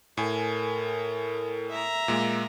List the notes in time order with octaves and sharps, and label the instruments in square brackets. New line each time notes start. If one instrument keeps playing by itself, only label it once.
[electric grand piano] A2 G#5 [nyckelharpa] A4 A#4
[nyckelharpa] E5 A#5
[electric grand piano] A#2 G#3 A#3